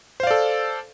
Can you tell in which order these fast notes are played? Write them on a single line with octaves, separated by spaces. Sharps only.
C5 F5 D5 A4